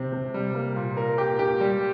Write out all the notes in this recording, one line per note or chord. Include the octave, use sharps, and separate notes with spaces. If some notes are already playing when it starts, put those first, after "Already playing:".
Already playing: C3 C4
C3
G3
A#3
A#2
A#4
G4
G4
G3